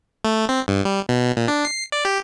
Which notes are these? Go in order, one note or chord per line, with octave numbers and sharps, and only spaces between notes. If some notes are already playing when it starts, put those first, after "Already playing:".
A3
C4
G2
G3
B2
A#2
D4
C7
D5
G4